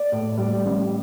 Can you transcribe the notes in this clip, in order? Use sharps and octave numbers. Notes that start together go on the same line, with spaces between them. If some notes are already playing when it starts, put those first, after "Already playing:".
Already playing: D5
A2
G3
A1